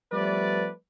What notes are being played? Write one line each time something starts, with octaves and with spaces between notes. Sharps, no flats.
F3 G3 A3 B3 B4 D5